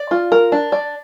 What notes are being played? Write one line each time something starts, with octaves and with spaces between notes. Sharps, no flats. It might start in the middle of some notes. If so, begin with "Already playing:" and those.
Already playing: D5
F4
A#4
D4
D5